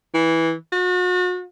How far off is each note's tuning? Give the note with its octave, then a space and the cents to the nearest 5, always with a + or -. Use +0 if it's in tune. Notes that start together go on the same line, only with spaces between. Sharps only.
E3 -10
F#4 -40